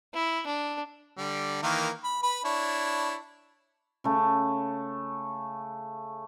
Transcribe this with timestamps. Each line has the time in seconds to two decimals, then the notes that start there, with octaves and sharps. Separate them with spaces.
0.14 E4
0.46 D4
1.17 D3 G3
1.62 D#3 E3 A#3
2.04 B5
2.23 B4 B5
2.44 D4 E4 C#5
4.04 C#3 A3